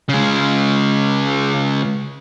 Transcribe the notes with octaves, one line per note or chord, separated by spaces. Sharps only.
C#3 G#3